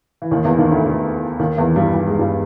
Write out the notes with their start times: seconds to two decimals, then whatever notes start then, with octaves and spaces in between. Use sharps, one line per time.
0.22 E3
0.31 D#2 D#3
0.45 E2 E3
0.58 D#2 D#3
0.71 D2 D3
0.85 D2 D3
1.39 D#2 D#3
1.57 E2 E3
1.76 G2 G3
1.94 G3
2.07 G#3
2.19 G2 G3